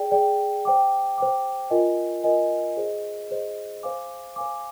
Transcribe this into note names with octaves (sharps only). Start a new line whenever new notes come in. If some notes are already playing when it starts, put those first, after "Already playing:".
Already playing: G#4 D5 G5
G#4 D5 G5
C5 G5 D6
C5 G5 D6
F4 A#4 D#5 G#5
F4 A#4 D#5 G#5
G#4 C5 D#5
G#4 C5 D#5
C5 F5 G#5 D6
C5 F5 G#5 D6